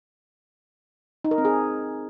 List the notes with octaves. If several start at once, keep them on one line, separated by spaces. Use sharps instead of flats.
D#4
A#4
C4
G#4